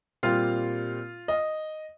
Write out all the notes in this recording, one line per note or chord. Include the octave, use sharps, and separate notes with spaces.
A#2 G3 C4 F4 F5
D#5